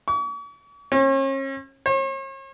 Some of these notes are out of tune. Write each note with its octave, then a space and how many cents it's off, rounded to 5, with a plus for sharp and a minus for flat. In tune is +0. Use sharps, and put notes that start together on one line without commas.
C#6 +45
C#4 -40
C#5 -45